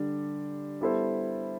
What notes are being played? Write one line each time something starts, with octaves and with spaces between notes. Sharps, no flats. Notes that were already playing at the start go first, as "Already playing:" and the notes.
Already playing: D3 G3 D4
G3 B3 E4 A4 C5